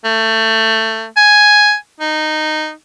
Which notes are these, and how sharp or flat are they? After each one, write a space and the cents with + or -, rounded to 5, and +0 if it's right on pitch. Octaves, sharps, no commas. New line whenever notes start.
A3 +20
G#5 +5
D#4 -10